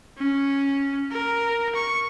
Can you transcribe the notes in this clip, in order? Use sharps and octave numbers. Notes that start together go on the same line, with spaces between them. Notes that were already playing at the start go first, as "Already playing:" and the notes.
C#4
A#4
C#6